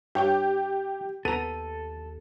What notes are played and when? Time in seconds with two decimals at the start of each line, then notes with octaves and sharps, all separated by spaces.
0.15 G2 G4 C#5 G5
1.25 D#2 B3 A4 A#5 D#7